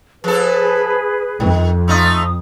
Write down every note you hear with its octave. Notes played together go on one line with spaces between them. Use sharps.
F3 G#4 A4 B4
F2 D#3
A3 D#4 F4 D#6